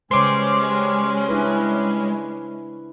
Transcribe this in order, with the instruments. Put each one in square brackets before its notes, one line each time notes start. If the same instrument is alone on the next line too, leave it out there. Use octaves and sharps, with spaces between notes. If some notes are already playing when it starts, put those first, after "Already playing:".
[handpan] C#3 B4 C5 [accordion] G3 C#4 [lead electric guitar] G#3 [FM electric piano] C6 D6
[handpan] D4 E4 B4